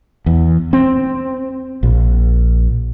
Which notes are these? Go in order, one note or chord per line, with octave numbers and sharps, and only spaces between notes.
E2
C4
A#1